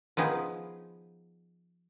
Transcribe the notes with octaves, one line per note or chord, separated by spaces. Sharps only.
F3 B3 D#4 G#4